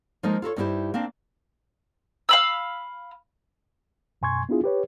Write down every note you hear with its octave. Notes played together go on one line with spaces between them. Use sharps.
F3 G#3 A#3 D#4 A#4
F4 A4 A#4 C#5
G2 C#4 D#4 E4 G4 C5
A#3 C4 D4
F5 B5 E6
F#2 B2 G#5 C6 C#6 G#6
B3 D4 E4 F4 G#4
G4 B4 C#5